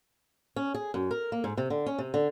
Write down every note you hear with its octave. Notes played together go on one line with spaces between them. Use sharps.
C#4
G#4
F#2
A#4
A#3
G#2
C3
D3
C#4
C3
D3